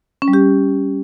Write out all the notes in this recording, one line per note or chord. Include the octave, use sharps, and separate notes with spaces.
C#4
G3
G4